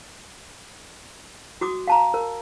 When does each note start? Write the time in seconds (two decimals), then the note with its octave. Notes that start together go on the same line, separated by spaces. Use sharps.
1.61 F#4 D6 D#6
1.87 F5 A5 A#5
2.14 A#4